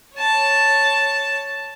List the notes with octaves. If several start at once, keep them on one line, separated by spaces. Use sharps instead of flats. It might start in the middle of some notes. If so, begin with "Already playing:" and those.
C#5 A5